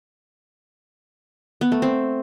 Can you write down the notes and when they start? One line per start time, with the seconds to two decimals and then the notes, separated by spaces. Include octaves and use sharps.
1.61 B3
1.72 A3
1.82 C4